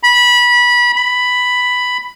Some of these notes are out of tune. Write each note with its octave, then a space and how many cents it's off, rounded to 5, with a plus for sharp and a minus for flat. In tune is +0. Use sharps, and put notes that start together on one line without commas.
B5 -20
B5 +5